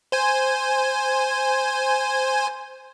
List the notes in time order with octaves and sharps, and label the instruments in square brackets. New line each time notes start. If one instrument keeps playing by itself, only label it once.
[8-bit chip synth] C5 G#5